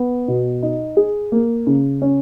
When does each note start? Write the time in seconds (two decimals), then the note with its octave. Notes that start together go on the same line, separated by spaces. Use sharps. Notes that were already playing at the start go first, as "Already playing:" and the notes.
Already playing: B3
0.28 B2
0.63 D#4
0.97 G#4
1.32 A#3
1.67 C#3
2.02 C#4